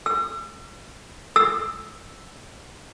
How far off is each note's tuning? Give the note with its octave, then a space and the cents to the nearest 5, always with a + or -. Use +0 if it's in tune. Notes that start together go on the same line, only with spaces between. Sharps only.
E6 +45
E6 +5